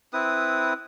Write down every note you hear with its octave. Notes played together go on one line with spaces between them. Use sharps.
C4 E4 B4 D#6